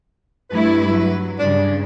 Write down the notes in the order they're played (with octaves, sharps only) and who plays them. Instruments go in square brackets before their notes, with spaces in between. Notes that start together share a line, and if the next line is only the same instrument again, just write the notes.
[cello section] G2 A3 E4 [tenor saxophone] B4
[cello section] F#3
[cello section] G2 C#3 [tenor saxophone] D4